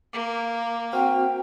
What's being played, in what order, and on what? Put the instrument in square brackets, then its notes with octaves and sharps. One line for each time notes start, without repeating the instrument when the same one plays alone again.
[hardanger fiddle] A#3 [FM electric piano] D6
[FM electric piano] C4 F#4 F6 [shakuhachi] G5